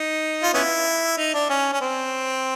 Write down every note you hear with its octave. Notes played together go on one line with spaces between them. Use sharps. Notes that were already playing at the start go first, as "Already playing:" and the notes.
Already playing: D#4
F4
B3 C#4 E4
D#4
D4
C#4
C#4
C4